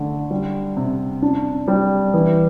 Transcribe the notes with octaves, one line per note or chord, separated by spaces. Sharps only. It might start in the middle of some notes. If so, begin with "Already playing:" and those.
Already playing: D3 A3
G3
C3
D4
G3
E3